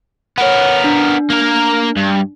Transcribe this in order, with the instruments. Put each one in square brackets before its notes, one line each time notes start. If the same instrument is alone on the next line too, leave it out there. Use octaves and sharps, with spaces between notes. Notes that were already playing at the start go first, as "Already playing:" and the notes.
[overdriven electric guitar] B3 A#4 [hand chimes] C#5 F#5
[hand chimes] D4
[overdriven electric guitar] A#3 A#4
G2